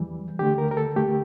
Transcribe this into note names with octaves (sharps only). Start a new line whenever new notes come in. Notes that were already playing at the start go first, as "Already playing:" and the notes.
Already playing: E2 E3 G3
D2 D3 A3 G4
A#4
A#4
A4
D2 D3 A3 G4